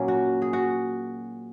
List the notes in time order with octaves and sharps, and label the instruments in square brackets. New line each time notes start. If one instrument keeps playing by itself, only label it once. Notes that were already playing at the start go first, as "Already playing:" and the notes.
Already playing: [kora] A#2 F#3 A#3 C#4
F#4
G#4
F#4